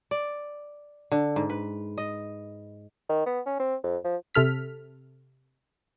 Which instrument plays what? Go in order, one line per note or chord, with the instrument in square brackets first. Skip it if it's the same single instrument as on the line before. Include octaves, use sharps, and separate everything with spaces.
[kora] D5
D3
G#2
B4
D#5
[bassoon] D#3
B3
C#4
C4
F2
F3
[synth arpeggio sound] C3 A4 F6 B6